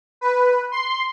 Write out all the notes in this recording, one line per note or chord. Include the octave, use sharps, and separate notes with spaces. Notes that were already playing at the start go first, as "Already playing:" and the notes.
B4
C6